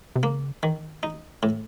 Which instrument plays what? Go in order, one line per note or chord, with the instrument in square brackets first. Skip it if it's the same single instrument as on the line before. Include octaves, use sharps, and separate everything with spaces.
[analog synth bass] C3
[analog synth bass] C#3 [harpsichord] A#3
[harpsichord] D#3
D#4
A2